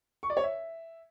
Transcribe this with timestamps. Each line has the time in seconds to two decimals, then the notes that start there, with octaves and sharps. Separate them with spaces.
0.23 C#6
0.30 D5
0.37 C#5
0.44 E5